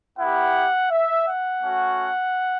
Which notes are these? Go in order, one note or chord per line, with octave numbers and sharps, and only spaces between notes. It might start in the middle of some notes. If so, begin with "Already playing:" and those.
B3 E4 G4 F#5
E5
F#5
A3 C#4 F#4